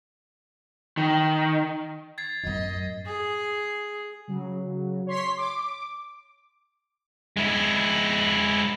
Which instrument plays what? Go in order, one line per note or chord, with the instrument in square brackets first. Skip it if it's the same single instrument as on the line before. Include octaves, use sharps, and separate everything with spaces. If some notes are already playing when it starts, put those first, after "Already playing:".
[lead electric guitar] D#3
[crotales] G#6 A6 C7
[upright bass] A1 F#2 [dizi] D#5
[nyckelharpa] G#4
[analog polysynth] C#3 F#3
C#5 C6 B6
D6
[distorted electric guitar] G#3 E4